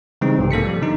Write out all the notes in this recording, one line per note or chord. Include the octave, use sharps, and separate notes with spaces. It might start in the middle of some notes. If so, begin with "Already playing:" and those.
C#3 E3 G3 G#3 C4 D#4
B1 G#2 C3
A#3 A4 B6 C#7
F3 G3
D3 D#4